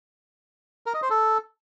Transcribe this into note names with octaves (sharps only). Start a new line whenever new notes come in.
A#4
D#5
C5
A4